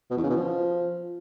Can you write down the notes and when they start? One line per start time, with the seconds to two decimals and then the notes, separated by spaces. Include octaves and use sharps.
0.11 B2
0.17 E2
0.23 C#3
0.30 B2
0.36 F3